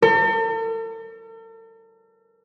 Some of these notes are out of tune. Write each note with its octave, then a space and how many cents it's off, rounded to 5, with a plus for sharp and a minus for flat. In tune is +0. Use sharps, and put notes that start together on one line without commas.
A4 +45